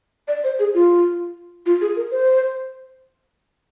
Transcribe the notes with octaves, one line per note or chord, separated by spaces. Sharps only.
D5
C5
G#4
F4
F4
G#4
A#4
C5